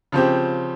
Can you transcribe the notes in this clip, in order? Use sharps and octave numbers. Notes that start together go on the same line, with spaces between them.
C#3 F3 C4 G4